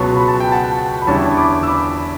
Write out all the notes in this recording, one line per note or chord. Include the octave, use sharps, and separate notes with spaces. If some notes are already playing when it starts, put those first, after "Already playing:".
Already playing: C#2 B2 F#3 B3 A5 C#6
B5
A5
G5
F#5 A5
B5
E2 D3 G3 C#4 E4 A5 C#6
B5 D6
E6
B5 D6